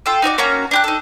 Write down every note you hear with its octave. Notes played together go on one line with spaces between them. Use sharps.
F4 A4 G5
D#4 F#4 C#5 D5
A#3 C#4 F#4 A#5
D4 G4 F#6
D#4 A4